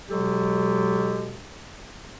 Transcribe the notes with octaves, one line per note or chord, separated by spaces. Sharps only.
B2 F#3 G#3 G4 A4